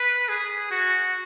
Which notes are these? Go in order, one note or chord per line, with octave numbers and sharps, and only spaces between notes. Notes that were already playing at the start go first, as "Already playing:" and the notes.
Already playing: B4
G#4
F#4